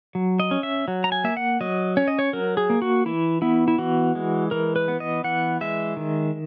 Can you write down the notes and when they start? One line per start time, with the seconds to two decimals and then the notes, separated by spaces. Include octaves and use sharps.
0.15 F#3
0.40 D#5
0.51 C#4
0.63 E5
0.88 F#3
1.04 A#5
1.12 G#5
1.24 A#3 E5
1.37 F#5
1.61 F#3 D#5
1.97 C#4 C#5
2.08 D#5
2.19 C#5
2.33 F#3 A#4
2.57 G#4
2.70 A#3
2.82 F#4
3.06 E3 E4
3.42 B3 E4
3.68 E4
3.78 E3 F#4
4.15 G#3
4.51 E3 A#4
4.76 B4
4.88 B3
5.00 D#5
5.24 E3 F#5
5.61 G#3 E5
5.97 D#3